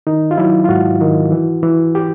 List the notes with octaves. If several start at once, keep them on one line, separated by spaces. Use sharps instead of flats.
D#3 D#4
F4
F#3 E4
F4
G#2 F#4
D#3
E3
E3
G4